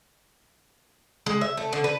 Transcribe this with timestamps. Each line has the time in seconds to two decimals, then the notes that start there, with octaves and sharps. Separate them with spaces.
1.26 G#3
1.41 E5
1.57 A3
1.73 D3
1.84 B4